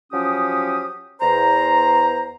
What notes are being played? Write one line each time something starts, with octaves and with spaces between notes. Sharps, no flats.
F3 F#3 C#4 G4 D#6
E2 C5 A#5